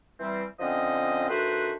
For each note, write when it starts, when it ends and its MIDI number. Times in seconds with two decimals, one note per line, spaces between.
0.20 0.44 52
0.20 0.44 55
0.20 0.44 60
0.60 1.28 50
0.60 1.28 53
0.60 1.28 60
0.60 1.28 61
0.60 1.28 75
1.29 1.73 51
1.29 1.73 57
1.29 1.73 62
1.29 1.73 66
1.29 1.73 71
1.29 1.73 72